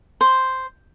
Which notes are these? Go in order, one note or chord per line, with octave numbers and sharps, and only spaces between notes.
C5